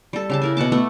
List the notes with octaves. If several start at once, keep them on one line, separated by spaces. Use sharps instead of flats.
G3 A4
C#3 G4 A5
E4 A#4 G#5
B2 F#5 A5 D6
A3 B3 A4 F#5